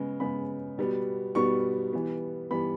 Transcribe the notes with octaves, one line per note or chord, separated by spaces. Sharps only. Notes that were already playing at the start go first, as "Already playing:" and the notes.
Already playing: C#3 G#3 B3
C#3 G#3 B3 B5
B2 G3 B3
B2 G3 B3 C#6
E3 G3 B3
E3 G3 B3 B5